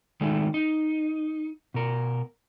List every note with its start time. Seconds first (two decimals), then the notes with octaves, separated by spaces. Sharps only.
0.21 D#3 G#3 A3
0.54 D#4
1.74 B2 A#4